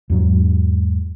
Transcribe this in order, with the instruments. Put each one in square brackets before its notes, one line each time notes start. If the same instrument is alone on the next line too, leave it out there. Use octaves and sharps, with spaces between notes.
[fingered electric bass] E2 G#2 F#3